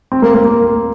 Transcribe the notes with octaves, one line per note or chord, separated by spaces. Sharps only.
C4
A#3
A#3
A#3